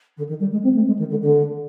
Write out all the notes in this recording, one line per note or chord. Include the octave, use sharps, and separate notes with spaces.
D3
D#3
G3
G#3
C4
A3
G#3
D#3
D3
D3